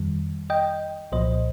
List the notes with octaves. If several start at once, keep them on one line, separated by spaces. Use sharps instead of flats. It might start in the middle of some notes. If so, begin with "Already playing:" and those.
Already playing: F2 D#3 G3
D#5 G5
C2 A#2 F3 C5 D#5